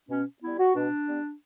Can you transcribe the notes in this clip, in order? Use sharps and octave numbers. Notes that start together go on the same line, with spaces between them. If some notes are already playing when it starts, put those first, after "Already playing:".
B2 C#4
G3 B3 E4
F#4
B2 D4
G3 B3